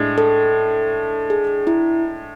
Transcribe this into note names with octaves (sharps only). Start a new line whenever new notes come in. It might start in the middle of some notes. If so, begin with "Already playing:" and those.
Already playing: A2 G#3 D4
A4
G#4
E4